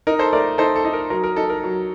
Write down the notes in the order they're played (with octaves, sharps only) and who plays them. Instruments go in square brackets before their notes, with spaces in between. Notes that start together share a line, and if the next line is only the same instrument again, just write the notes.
[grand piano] D#4 A#4
A4 C5
A3 A#4 D5
D#4 A4 C5
A4
D#4
A#4
F#3 A#4
A#4
D#4 A4
A#4
F#3